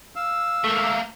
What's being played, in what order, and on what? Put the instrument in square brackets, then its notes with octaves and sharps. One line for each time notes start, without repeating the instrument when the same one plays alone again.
[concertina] F5 E6
[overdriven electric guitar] A3 A#3